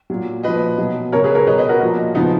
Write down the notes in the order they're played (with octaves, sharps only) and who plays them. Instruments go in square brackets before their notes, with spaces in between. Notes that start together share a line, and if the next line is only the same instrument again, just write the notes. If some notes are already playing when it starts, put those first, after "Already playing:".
[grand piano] A#2 F#3
A#2 F3 B4 D#5
B2 F#3
C#3 F#3 A#4 C#5
G#4 B4
A#4 C#5
B2 F#3 B4 D#5
B4 D#5
F#4 A#4
A#2 F3
C#3 F3 B3 D#4